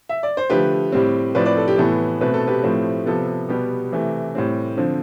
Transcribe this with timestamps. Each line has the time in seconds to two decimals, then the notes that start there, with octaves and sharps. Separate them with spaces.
0.09 E5
0.23 D5
0.37 C5
0.50 D3 F3 A3 G4 B4
0.92 A2 G3 C4
1.35 A2 F3 C4 B4 D5
1.46 B4 D5
1.57 A4
1.68 G4
1.78 A2 E3 B3 A4
2.21 B2 A3 C4 B4
2.34 A4
2.47 G4 B4
2.63 A2 F3 A3 C4
3.06 C3 F3 B3 A4
3.49 B2 G3 B3 G4
3.92 C3 E3 A3
4.35 A2 G3 C4
4.77 D3 F3 C4